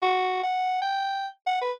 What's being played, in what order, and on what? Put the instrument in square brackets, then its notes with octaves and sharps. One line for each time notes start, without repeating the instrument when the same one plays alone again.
[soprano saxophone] F#4
F#5
G5
F#5
B4